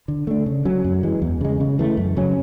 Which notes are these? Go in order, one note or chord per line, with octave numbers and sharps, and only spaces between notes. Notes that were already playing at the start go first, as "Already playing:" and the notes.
D3
A3 D4
C#3
F#3 C#4
F#2
E3 G#3
E2
C#3 G#3
C#3
E3 A3
F#2
C#3 F#3 C#4